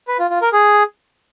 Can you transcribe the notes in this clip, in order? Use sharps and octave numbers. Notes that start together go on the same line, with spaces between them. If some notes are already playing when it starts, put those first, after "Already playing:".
B4
F4
F4
A#4
G#4